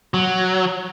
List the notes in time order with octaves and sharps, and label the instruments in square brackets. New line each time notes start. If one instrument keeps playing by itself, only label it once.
[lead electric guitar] F#3